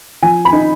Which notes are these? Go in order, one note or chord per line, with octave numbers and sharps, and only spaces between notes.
F3 G#5
B5
D#4